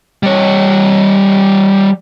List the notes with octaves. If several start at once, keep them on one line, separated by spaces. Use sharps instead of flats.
G3 C#5